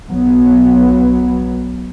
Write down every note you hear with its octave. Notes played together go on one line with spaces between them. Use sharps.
B1 F#3 B3